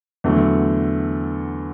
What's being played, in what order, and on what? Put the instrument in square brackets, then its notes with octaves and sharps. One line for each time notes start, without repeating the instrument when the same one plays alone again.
[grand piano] E2 D3 F#3 A3